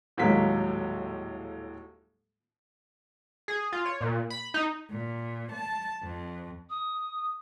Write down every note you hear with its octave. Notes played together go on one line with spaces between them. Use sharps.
D#1 A2 F#3 G#3 A#3 B6
G#4
F4
C#5
A#2
B5
D#4
A#2
A5
F2
D#6